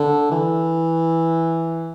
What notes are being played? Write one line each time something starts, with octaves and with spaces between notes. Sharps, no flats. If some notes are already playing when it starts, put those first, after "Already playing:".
Already playing: D3
E3